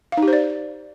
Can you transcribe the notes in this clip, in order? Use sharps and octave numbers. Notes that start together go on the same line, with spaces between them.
F5
D#4
G4
C5
D5